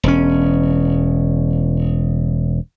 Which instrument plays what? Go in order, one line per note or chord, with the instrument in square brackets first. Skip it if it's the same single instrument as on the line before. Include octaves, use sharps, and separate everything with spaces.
[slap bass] E1 C#4